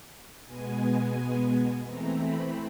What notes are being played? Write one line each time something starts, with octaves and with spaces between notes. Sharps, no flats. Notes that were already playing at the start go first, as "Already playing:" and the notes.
B2 G#3 B3 G#5
E3 A3 C4 A#5
B5